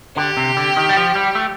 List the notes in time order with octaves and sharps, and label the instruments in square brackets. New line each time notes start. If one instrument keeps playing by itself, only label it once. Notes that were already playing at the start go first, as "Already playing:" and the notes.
[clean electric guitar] D3 [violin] G4
[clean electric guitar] C3
D3
D#3
G3
F3
G3
A3